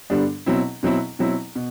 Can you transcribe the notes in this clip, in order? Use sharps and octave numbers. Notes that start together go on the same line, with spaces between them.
G2 D3 G3 B3 D4
B2 F#3 C4 E4
B2 F#3 C4 E4
B2 F#3 C4 E4
B2